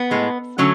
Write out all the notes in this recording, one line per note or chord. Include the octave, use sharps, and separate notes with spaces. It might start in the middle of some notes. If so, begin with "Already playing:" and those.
Already playing: B3
A2 G#3
D3 F#3 A3 C#4